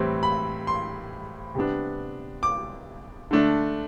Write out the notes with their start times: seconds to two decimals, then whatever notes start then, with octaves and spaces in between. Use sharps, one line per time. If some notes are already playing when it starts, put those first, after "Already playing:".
Already playing: A2 E3 G3 C4
0.23 B5
0.67 C6
1.55 C3 G3 B3 D4
2.43 D6
3.31 D3 A3 D4